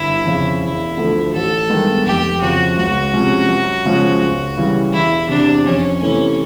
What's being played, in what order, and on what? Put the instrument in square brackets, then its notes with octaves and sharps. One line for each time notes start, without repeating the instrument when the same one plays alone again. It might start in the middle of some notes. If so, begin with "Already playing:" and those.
Already playing: [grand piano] G1 [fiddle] E4
[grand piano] F2 C#3
[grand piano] E1 [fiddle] E4
[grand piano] D2 D3 F3 A3
[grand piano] A1 [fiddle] A4
[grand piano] G2 D#3 G#3 B3
[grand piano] F1 [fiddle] G4
[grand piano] F2 C#3 F3 [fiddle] F#4
[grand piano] C#2 [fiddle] F#4
[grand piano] C3 F3 G#3 C#4
F#2
C#3 F3 G#3 C#4
C#2
C#3 E3 G3
[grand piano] E1 [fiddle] E4
[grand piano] E2 C3 [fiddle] D4
[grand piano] F2 [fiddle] C#4
[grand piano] C3 E3 A3 [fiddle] C#4